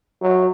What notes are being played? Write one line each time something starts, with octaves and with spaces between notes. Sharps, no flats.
F#3